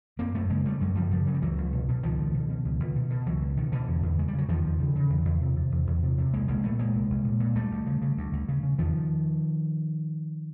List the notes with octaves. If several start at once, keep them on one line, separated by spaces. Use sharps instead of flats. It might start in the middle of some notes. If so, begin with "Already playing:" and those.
F#2 A#3 C4
F#2 A3 B3
C#3 G#3 A#3
C#3 G3 A3
F#2 F#3 G#3
F#2 F3 G3
C#3 F3 G3
C#3 F#3
G3
C#2 E3 F#3
C#2
B2
B2
C#2 D#3 F3
C#2
B2
B2
C#2
C#2
B2
B2
C#2 E3 F#3
C#2
B2 D#3
B2 D3 E3
E2
E2
C#3 G#3
G3
C#3
F#3
E2 D#3 F3
E2
C#3
C#3
E2
E2
C3
C3
E2
E2
C3
C3
C2 G#3 A#3
C2 G#3 A#3
A#2 A3 B3
A#2 G#3 A#3
C2
C2
A#2
A#2
D2 G3 A3
D2
C#3
C#3
D2
D2
C#3
C#3
E2 D#3 F3